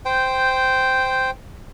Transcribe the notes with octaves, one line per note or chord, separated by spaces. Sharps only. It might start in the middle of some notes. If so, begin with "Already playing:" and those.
C5 G5